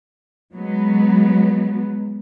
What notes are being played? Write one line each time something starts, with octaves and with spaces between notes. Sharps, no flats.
F#3 G#3 B3